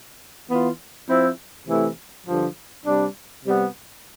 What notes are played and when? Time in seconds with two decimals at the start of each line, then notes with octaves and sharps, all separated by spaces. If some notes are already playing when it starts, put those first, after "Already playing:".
0.49 E3 B3 F4
1.08 F3 C4 E4
1.67 C3 E3 A3 E4
2.26 G2 D3 F3
2.85 C3 G3 D4
3.45 C3 G3 B3